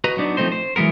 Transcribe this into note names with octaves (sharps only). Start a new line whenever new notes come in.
F#4 B4 D#5 A#5
F#3 B3 D4 D#4
F3 A3 C4 D#4 C5
C5
E3 F#3 G#3 B3 A#4